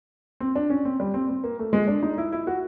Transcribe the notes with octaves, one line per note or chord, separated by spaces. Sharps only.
C4
D4
C#4
C4
G3
C4
C4
A#3
A3
G#3
D4
D#4
E4
E4
F#4